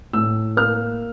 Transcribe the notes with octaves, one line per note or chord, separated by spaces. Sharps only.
A2 E6
A#3 F6